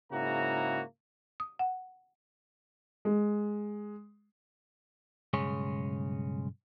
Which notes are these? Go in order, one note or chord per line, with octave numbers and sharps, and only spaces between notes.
G#2 C#3 A#3 E4 F#4 A#5
D#6
F#5
G#3
B1 G2 C#3 G#3 G#4 C#5